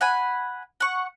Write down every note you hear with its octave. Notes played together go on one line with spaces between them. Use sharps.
F#5 G#5 B5
F#5 C#6